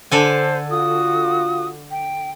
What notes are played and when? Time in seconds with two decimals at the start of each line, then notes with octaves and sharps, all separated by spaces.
0.12 D3 A4 C5 G#5
0.71 F4 F#4 D#6
1.91 G5